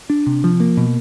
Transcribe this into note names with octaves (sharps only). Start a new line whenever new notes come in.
D4
C3
F3
A#3
B2